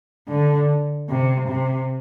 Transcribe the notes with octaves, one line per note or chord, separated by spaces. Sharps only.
D3
C3
C3